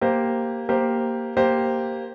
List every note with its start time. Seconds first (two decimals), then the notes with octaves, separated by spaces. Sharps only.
0.01 A#3 G4 C5
0.69 A#3 G4 C5
1.37 A#3 G4 C5